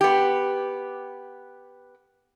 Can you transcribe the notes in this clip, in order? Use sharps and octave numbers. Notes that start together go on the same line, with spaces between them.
B3 G4